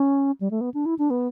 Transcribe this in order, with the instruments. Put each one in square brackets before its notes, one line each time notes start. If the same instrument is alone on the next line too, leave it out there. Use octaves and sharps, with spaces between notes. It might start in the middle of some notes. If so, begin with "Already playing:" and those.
Already playing: [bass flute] C#4
G3
A3
B3
D4
E4
D4
B3